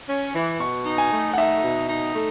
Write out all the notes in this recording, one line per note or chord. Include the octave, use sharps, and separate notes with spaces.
C#4
E3
B2 C#6
D#4
G#5
A3
F#5
D#4 E5
B2
D#4
A3